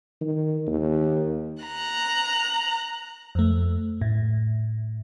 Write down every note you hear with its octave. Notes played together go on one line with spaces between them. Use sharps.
D#3
D#2
A#5 F#6
F2 A3
A2